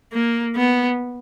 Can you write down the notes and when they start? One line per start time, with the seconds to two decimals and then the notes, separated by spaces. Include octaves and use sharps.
0.12 A#3
0.55 B3